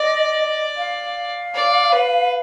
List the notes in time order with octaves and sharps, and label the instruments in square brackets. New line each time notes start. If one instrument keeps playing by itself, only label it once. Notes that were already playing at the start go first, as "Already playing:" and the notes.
Already playing: [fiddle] D5 [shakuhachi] D#5
[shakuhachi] F5
[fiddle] D5
B4